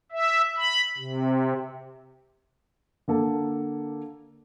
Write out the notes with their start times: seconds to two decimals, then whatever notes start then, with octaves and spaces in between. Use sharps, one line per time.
0.12 E5
0.57 B5
0.98 C3
3.08 D3 A#3 A4